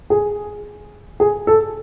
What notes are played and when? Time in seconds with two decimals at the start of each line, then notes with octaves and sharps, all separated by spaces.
0.10 G#4
1.20 G#4
1.47 A4